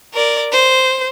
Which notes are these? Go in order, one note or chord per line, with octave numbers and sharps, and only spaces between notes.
A#4 D5
C5